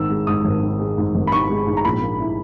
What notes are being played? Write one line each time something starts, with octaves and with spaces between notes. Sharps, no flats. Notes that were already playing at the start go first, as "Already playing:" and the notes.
Already playing: G#1 D#3 E6
G#3
G#2 D#6
G#1
D#3
G#3
G#2
G#1
B5
D#3 C#6
G#3
G#2
A#5
A#1 B5
A#3
E4